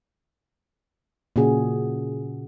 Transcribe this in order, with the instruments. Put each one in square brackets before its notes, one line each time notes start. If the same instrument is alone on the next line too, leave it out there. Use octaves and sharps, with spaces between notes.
[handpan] A#2 C#3 F#4 G#4